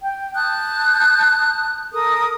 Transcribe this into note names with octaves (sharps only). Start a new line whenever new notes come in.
G5
A5 D#6 F#6 G6
A4 A#4 D#6